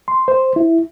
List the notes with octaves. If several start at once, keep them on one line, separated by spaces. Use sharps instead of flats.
C6
C5
E4